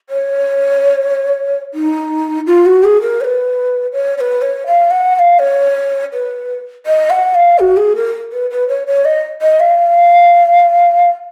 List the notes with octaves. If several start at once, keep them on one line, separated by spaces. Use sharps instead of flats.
C#5
D#4
F4
F#4
G#4
A#4
C#5
B4
C#5
C#5
B4
C#5
F5
F#5
F#5
F5
C#5
B4
D#5
F#5
F5
F#4
G#4
A#4
B4
B4
C#5
C#5
D#5
D#5
F5